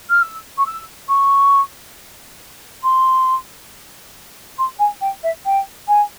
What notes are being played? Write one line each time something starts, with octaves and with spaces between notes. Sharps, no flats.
F6
E6
C#6
E6
C#6
C6
C6
G#5
G5
E5
G5
G#5